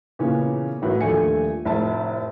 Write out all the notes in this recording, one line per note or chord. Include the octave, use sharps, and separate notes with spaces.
A#2 C#3 E3 B3 C#4
A1 A2 F#4 B4
D#1 F3 A3 D4 G#5 C#7
F1 A2 E5 A5